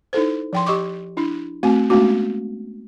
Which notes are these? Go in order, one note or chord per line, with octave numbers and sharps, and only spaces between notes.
D#4 E4 A4 C5
F3 G5 C6
G4 D#5 C#6 D6
D4 E4
A3 C4 F#4 G#5
G#3 A3 B3 C#4 D4 F#4